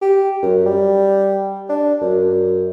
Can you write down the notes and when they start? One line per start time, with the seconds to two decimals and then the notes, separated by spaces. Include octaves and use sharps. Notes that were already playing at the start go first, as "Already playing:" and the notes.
0.02 G4
0.42 F#2
0.66 G3
1.69 D4
2.01 F#2